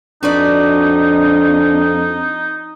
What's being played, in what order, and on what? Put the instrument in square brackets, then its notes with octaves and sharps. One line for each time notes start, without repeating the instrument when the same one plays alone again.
[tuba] F2 [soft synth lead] D4 [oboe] D#4 [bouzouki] F#4 B4 D5